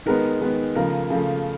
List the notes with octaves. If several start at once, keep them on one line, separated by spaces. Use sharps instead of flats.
D#3 G#3 B3 A#4
D#3 G#3 B3
C#3 F3 A3 A#4
C#3 F3 A3